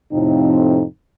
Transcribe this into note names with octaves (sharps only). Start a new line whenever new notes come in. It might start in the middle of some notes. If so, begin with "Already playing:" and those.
F2 A2 C3 F3 C4 D#4